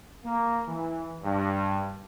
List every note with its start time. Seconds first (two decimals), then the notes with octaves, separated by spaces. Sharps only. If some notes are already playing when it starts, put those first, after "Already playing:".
0.24 A#3
0.67 E3
1.23 G2